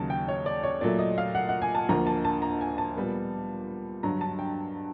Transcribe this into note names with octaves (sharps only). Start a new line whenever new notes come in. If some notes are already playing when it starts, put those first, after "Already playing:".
Already playing: D#2 C#3 F#3 A5
G5
C#5
D5
C#5
A#2 F#3 A3 D5
D#5
F5
F#5
F#5
G#5
A5
D2 D3 F3 A#3 A#5
A5
A5
A#5
G#5
A5
A#2 G3 B3
G2 D3 F#3 A#5
A5
G5